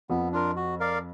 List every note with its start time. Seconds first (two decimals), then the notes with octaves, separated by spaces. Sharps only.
0.10 F2 F3 B3
0.33 D4 F4 A#4
0.56 F#4
0.80 A#4 D5 F5